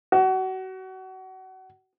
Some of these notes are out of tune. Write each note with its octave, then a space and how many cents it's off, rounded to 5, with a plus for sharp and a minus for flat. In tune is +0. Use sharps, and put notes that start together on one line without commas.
F#4 +30